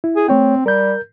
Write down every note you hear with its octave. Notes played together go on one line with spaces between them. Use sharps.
E4
G#4
A3 C4 C#5 G5
G3 A#4 G6